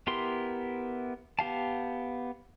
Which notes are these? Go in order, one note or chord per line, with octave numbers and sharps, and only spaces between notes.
B3 E4 G4 A#4 C6
B3 G4 F5 A5